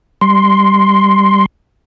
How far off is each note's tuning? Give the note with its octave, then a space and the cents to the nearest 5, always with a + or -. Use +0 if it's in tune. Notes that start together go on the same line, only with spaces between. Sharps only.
G3 +0 C6 +0